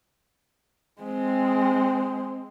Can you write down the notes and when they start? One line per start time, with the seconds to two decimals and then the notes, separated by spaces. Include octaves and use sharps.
1.02 G#3 C4